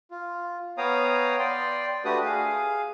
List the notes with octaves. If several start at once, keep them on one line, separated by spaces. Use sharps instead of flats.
F4
B3 C#5 F5 G5 A#5 D#6
D5 G5 C6
A3 D4 F#4 G4 B4 D#6
G#4 F5